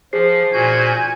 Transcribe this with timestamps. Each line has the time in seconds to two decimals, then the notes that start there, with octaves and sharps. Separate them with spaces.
0.13 F3 G#4 C5 C7
0.54 A#2 F#4 G#5 G6